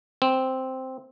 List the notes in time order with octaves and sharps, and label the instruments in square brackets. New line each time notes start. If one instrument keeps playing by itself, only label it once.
[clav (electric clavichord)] C4